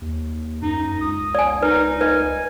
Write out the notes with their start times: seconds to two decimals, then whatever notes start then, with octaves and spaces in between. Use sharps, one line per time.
0.02 D#2
0.62 F#2 D#4
1.01 C#2 D#6
1.35 D5 G#5
1.62 D#4 B4
2.01 B4 D#5 G#5